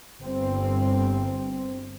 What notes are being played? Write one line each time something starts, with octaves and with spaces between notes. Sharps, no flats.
G1 C4